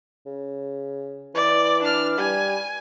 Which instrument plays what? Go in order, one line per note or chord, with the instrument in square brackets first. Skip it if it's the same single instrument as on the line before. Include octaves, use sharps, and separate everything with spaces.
[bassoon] C#3
[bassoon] E3 [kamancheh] D5
[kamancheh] D4 F6
[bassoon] G3 [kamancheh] G#5